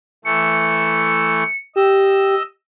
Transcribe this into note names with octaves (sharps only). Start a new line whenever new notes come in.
E3 A3 C#7
G4 D#5 E6